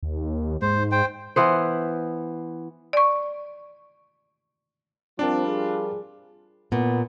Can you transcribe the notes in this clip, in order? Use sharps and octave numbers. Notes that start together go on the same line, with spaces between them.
D#2
G#2 C5
C5 G5
E3 B3 C5
D5 C#6
F3 G3 C4 D4 F4 A#4 A5 D6
G#4
A#2 B3